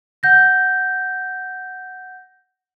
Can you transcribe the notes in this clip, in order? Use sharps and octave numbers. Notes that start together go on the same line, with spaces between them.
F#5 G6 A#6